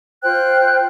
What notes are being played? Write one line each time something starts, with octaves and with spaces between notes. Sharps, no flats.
F4 C5 G5 F#6